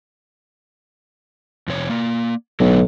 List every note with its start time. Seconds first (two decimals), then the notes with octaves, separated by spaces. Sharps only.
1.68 F2 C3 C#5
1.90 A#3 D5
2.60 B1 A2 D3 F#3